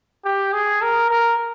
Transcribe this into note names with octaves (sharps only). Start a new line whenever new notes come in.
G4
G#4
A#4
A#4